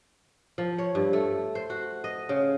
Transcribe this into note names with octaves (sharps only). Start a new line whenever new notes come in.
F3
C#5
G2
A3
C5
F#4
D#5
C#3